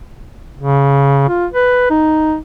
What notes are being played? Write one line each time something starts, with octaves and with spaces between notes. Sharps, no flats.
C#3
F4
B4
D#4